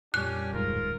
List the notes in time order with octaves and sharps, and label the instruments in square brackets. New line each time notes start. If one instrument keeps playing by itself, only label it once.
[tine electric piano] F2 A#2 G3 [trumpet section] C#4 D4 G4 [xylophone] F#6
[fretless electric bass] D1 G#2 [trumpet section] F4 A#4